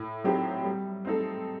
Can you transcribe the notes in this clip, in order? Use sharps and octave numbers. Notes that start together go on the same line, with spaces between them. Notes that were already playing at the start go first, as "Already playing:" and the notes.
Already playing: A2
F#3 C4 D#4 G4
G3
C4 D#4 A4